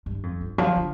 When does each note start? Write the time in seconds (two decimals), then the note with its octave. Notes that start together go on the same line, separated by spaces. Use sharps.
0.06 G2
0.23 F2
0.41 G2
0.58 F3
0.76 D3